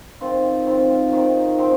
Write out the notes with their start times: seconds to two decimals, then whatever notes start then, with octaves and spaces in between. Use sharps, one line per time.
0.21 D#3 C4 F4
0.67 D#3 C4 F4
1.12 D#3 C4 D#4
1.59 D#3 C4